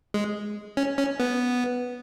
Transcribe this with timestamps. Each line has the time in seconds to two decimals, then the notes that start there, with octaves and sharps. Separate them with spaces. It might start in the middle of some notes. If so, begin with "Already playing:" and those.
0.14 G#3
0.77 C#4
0.98 C#4
1.20 B3